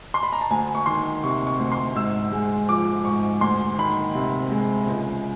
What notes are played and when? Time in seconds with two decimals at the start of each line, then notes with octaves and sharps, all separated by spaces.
0.14 C6
0.23 B5
0.32 A#5
0.41 A5
0.50 D2 G#5
0.75 C#6
0.86 D#3 C6
1.23 C3 C#6
1.47 C#6
1.59 D2
1.72 C6
1.95 G#2 E6
2.32 G#3
2.69 F3 D6
3.05 G#2 C#6
3.41 D2 C6
3.78 D#3 B5
4.15 C3
4.51 G#3
4.87 C#2